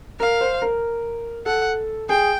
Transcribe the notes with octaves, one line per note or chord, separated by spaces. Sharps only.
A#4 F5
C5
A#4
A4 F#5
G#4 G5